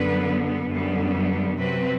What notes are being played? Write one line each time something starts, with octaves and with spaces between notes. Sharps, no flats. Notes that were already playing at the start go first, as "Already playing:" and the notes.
Already playing: F#2 D3 G3 B3 B4
F#2 D3 G3 B3
C3 F#3 C4 B4